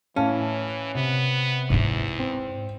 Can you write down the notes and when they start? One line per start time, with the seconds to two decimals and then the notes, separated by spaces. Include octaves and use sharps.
0.16 A2 E3 C#4 F5 A5
0.95 C3 B3
1.70 E2 G#2 E4
2.19 C4